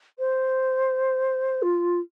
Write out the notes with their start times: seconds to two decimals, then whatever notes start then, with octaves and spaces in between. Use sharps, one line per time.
0.19 C5
1.62 F4